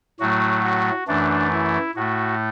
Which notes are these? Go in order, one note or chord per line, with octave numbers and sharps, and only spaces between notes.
A2 F#3 A3 F#4
F#4
F#2 E3 A3 D4
E4
A2 A3 F#4